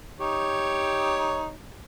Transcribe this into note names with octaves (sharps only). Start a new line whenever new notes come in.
D#4 G4 C#5